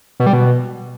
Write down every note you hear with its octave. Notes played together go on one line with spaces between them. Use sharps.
B2
G3
B2